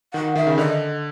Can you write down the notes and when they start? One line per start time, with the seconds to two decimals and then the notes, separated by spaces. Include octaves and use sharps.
0.14 D#3 F#5
0.35 D#3 E5
0.47 C#3
0.57 D3 D#5